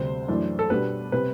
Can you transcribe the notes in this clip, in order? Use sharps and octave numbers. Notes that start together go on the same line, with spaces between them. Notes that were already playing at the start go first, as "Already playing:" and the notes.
Already playing: D2 C3 G3 C5
F#2 E3 A3 D4
A4
B2 G3 B3 D4 B4
C3 G3 C4 B4